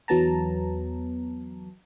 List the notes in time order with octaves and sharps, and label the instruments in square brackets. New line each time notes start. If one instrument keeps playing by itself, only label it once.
[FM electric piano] E2 F#3 B3 A5 A#5